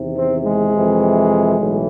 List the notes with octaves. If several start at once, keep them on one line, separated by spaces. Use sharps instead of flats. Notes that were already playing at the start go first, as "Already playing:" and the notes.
Already playing: E2 C3 D#3
C4
G#3
F2 C3 E3
B1 A2 E3